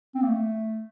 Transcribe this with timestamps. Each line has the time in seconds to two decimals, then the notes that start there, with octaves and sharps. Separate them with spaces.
0.15 C4
0.22 A#3
0.29 A3